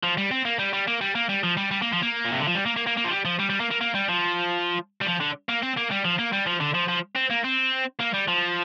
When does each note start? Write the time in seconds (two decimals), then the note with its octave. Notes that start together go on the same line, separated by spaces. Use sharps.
0.03 F3
0.18 G3
0.31 C4
0.45 A#3
0.59 G3
0.73 G3
0.88 A#3
1.01 G3
1.15 A#3
1.29 G3
1.43 F3
1.57 G3
1.71 G3
1.82 A#3
1.93 F3
2.03 A#3
2.25 A#2
2.32 C3
2.40 D3
2.48 F3
2.55 G3
2.66 A#3
2.76 A#3
2.87 A#3
2.97 A#3
3.04 F3
3.11 G3
3.25 F3
3.39 G3
3.50 G3
3.60 A#3
3.71 A#3
3.81 A#3
3.95 G3
4.09 F3
5.02 G3
5.07 F3
5.20 D3
5.49 A#3
5.62 C4
5.77 A#3
5.91 G3
6.05 F3
6.19 A#3
6.33 G3
6.46 F3
6.60 D3
6.74 F3
6.89 F3
7.16 C4
7.31 A#3
7.45 C4
8.00 A#3
8.14 G3
8.28 F3